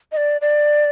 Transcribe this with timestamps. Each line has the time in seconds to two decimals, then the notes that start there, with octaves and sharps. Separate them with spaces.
0.12 D#5
0.17 D5
0.41 D5